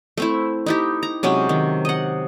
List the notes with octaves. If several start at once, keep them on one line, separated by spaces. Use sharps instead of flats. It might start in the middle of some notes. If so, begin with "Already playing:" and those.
A3 C4 E4
D#4 E4 G4
A#5
C3 F#3 G#3 C#4
D#3
D#5 F#5